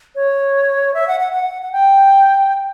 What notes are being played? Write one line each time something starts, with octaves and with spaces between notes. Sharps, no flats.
C#5
E5
F#5
F#5
F#5
F#5
G5